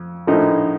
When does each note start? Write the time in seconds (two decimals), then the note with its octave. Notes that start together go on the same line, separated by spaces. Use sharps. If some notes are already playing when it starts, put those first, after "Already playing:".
Already playing: F2
0.27 A#1 A2 F3 A3 D#4